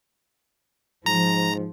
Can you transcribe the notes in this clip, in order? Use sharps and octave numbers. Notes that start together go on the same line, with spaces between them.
G#2 F3 A#5